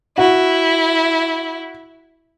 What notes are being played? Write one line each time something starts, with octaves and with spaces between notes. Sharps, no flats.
E4 F#4